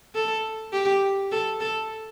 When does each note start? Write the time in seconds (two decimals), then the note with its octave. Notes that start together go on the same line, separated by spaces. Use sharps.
0.15 A4
0.73 G4
1.32 A4
1.60 A4